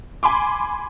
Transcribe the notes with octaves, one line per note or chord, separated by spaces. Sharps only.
G#5 B5 C6 D6